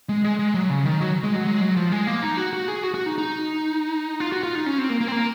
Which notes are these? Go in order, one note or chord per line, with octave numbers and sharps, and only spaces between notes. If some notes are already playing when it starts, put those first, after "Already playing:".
G#3
G#3
G#3
F#3
C#3
D#3
F#3
G#3
F#3
G#3
F#3
F3
G#3
A#3
D#4
F#4
F#4
G#4
F#4
F#4
D#4
D#4
F4
F#4
F4
D#4
C#4
C4
A#3
A#3
C4
A#3